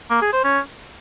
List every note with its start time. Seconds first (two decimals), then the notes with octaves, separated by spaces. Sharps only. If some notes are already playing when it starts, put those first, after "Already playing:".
0.10 A#3
0.22 G#4
0.33 C5
0.44 C#4